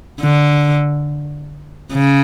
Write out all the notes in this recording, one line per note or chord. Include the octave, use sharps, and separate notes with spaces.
D3
C#3